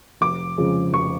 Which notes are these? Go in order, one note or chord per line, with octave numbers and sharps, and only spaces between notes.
F1 D6
F2 C#3 F3 G#3
F1 C#6